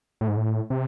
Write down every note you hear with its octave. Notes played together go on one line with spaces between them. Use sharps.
A2
G#2
A2
C3